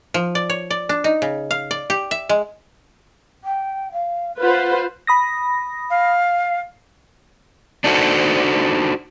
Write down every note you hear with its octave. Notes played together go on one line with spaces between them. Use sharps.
F3
D5
C#5
D5
D4
D#4
C#3
F5
D5
G4
E5
G#3
G5
F5
F4 B4 C5 F#5
B5 D#6 A#6
F5
D4 D#4 F#4 A4 C5